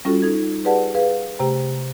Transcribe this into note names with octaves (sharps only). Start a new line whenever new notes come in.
G3 C#4 F4 F#4 A4
D#4 A4 G#6
G4 G#4 B4 D5 F#5 A5
G#4 B4 F5
C3 A3 G4 G5 A#5